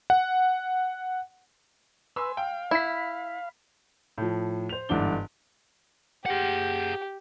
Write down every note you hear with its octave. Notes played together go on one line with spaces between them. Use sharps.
F#5
B4 G#5 C6 E6
F5 G5
E4 B5 B6
A2 F3
C5 F7
G1 G#2 E3 D4 G7
G4 G#4 F#5